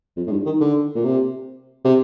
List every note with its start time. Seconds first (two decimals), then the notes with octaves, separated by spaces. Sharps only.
0.16 F2
0.27 A2
0.31 G2
0.46 D#3
0.61 D3
0.95 A#2
1.05 C3
1.85 C3